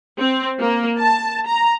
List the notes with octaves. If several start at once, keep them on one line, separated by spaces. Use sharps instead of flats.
C4
A#3
A5
A#5